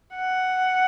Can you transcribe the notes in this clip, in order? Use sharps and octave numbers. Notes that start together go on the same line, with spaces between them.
F#5